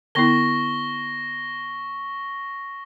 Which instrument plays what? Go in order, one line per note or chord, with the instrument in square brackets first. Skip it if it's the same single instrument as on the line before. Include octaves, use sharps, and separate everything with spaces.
[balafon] D3 B3 E4 [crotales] C#6 A#6 G7